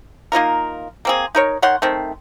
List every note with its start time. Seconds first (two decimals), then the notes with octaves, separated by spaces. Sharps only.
0.32 A#3 D#4 F4 A#4
1.05 A#3 C4 G#4
1.35 D#4 A#4 C#5
1.62 D#3 C#5 F#5 C6
1.82 D#3 A3 C4